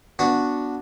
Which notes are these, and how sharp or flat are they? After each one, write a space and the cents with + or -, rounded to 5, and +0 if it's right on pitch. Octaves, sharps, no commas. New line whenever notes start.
B3 -10 D4 -10 F#4 -10